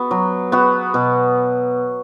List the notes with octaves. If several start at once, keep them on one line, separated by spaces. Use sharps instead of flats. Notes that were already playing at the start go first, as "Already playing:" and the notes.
Already playing: B3 F#4
F#3
B3 F#4
B2